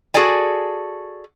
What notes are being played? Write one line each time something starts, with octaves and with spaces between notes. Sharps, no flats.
F#4 G#4 A4 D5 G#5